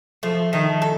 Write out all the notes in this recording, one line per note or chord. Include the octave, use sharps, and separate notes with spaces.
F3 A3
D#3 A3
A4